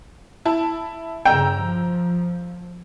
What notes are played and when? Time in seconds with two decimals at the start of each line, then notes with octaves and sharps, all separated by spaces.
0.45 E4 A5
1.25 G2 C#3 G5 A#5 E6
1.61 F3